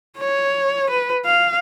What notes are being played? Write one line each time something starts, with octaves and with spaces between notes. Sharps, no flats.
C#5
B4
F5